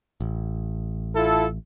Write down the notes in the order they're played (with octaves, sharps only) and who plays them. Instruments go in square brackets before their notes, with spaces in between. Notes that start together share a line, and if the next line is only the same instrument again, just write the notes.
[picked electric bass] A1
[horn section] E4 F4 A4